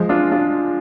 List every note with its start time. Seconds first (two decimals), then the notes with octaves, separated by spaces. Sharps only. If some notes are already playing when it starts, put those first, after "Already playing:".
Already playing: F3 G#3
0.09 D4 F4
0.32 D4 F4